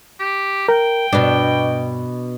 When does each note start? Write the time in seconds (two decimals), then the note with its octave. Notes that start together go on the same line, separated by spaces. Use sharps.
0.20 G4
0.68 A#4 G5
1.13 G2 B2 D4